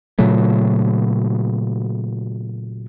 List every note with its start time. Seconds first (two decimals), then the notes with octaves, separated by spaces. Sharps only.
0.19 A#2 C#3 F#3 A3